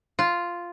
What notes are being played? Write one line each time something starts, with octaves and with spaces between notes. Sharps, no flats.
F4